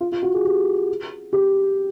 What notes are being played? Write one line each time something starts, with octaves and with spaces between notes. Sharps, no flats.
F4
F4
F#4
G#4
G4
G4